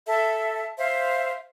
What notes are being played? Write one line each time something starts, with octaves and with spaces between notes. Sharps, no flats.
A4 E5
C5 E5 F5